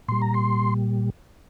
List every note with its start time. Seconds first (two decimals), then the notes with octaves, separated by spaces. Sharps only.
0.08 A#2 G3 C6
0.22 A#5
0.34 C6